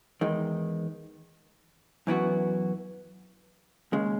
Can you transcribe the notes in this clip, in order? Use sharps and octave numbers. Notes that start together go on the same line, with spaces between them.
E2 D#3 G#3
F#2 E3 B3 F#4
D#2 C#3 G#3